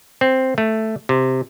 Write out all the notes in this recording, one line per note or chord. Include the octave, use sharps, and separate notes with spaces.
C4
A3
C3